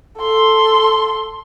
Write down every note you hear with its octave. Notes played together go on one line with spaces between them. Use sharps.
A4 C6